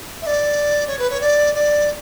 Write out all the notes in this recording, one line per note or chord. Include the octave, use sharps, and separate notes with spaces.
E5
D5
C#5
B4
C#5
D5
D5